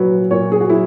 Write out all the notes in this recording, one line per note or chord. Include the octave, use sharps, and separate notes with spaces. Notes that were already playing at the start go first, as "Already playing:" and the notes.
Already playing: A#2 F#3 B4
A#2 C#5
G#4
F#4
F#3 E4